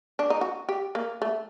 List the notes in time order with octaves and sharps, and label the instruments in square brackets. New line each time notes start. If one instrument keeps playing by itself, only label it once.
[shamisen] D4
D#4
F#4
G4
A#3
A3